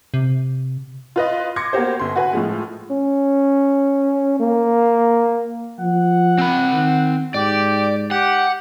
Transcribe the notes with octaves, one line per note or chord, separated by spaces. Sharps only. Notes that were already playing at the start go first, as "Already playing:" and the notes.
C3
F4 B4 D#5
C6 D6 G#6 A#6 C#7
A#3 B3 F#4 G4 C5
G1 C6
F#4 B4 G#5
A2 F3 G#3
C#4
A#3
F3 F#5
C4 B5
D#3
G#2 G4 D5
G4 F#5